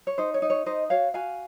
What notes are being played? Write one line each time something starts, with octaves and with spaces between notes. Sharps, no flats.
C#5
D#4 C5
C#5
D#4
C#5
D#4 C5 D#5
F#4 C#5 F5
F#4 F5 G#5